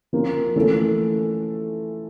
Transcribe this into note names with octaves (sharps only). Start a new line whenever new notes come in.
F3 A#3 C#4 F4
E3 A3 C#4 F4 A4